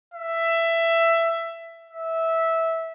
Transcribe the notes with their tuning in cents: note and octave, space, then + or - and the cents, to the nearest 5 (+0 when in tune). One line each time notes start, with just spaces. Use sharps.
E5 +15
E5 -15